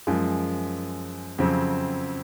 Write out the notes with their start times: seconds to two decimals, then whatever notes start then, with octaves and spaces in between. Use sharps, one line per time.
0.07 F#2 F3 G#3
1.38 F2 C#3 F#3 C4